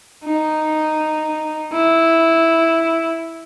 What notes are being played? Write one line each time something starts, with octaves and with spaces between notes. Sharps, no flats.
D#4
E4